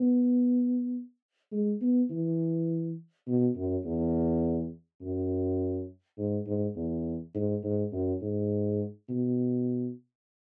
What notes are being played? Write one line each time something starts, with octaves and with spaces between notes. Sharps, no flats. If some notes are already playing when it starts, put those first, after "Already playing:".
Already playing: B3
G#3
B3
E3
B2
F#2
E2
F#2
G#2
G#2
E2
G#2
G#2
F#2
G#2
B2